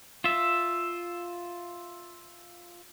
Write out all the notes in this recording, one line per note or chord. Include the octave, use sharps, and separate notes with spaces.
F4 E5